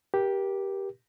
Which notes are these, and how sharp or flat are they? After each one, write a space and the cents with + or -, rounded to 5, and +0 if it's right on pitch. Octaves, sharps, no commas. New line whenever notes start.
G4 +0 A#4 +35